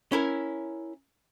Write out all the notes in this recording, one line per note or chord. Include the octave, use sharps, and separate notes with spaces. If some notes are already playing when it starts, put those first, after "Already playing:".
C#4 E4 A#4